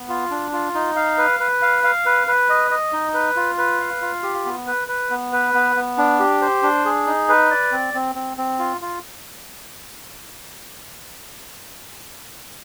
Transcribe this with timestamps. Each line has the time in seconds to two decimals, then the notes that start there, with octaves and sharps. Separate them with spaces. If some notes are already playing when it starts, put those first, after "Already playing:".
Already playing: B3
0.09 F4
0.31 D4
0.53 F4
0.74 D#4
0.96 F5
1.18 B4
1.40 B4
1.62 F5
1.84 F5
2.06 B4
2.27 B4
2.49 D#5
2.71 D#5
2.93 D#4
3.14 B4
3.36 F4
3.58 B4
3.80 F5
4.02 F4
4.23 G4
4.45 B3
4.67 B4
4.88 B4
5.10 B3
5.32 B4
5.54 B3
5.76 B3
5.98 D4
6.19 G4
6.41 C5
6.63 D4
6.85 G#4
7.07 D#4
7.29 B4
7.51 D5
7.72 C4
7.94 C4
8.15 C4
8.38 C4
8.59 F4
8.81 F4